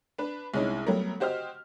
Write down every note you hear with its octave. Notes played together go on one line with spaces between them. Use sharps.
D4 B4
C2 G#3 C#4 D#4 E4
F#3 G3 A3 B3 A#4
F#4 G4 C5 D#5 F6